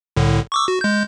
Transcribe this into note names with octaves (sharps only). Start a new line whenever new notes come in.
C2 A2 D3
C#6 D6 E6
F#4
G#3 G6